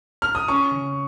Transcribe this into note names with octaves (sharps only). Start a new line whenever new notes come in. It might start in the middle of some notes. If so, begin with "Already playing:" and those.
F6
D#6
C#4 C#6
C#3